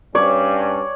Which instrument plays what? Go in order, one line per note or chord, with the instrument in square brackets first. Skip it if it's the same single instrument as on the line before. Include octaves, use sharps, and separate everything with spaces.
[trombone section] G2 C#4 [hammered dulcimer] C#5 [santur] D5